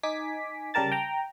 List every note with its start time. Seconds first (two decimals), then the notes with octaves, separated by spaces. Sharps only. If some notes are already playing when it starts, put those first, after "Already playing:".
0.03 D#4 G#5 D6 B6
0.74 C#3 G3 G4 A#4 A5 A6
0.92 G5 A#5